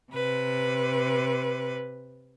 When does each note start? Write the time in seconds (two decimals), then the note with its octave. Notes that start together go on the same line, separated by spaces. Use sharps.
0.12 C3 B4